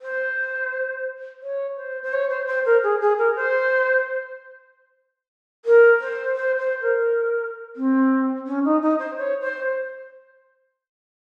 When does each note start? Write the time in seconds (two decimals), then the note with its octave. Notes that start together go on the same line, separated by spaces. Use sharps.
0.02 C5
1.42 C#5
1.77 C5
2.03 C5
2.13 C#5
2.30 C5
2.47 C5
2.66 A#4
2.83 G#4
3.01 G#4
3.18 A#4
3.36 C5
5.65 A#4
6.00 C5
6.36 C5
6.59 C5
6.82 A#4
7.76 C4
8.47 C#4
8.65 D#4
8.82 D#4
8.99 C5
9.18 C#5
9.41 C5